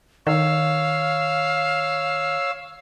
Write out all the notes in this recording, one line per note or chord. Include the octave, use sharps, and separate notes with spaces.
D#3 C#5 F5 E6